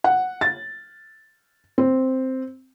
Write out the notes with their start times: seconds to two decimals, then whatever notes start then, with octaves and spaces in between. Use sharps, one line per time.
0.04 F#5
0.41 A6
1.78 C4